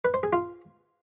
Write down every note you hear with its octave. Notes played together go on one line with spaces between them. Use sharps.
B4
C5
G#4
F4